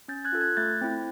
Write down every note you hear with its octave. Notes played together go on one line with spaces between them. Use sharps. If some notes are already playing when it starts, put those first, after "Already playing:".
C#4 G6 A6
F#6 G#6
F4 A4
F#6 G#6
A3 G6 A6
C4 E4